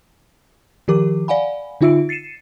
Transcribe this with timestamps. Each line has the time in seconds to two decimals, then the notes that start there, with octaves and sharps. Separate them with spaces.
0.88 D#3 F3 G4 A#4 D6
1.28 D5 F5 F#5 G#5 B5
1.81 D3 D#4 F4 E5 E6 D7
2.09 A6 C7 C#7 D#7 E7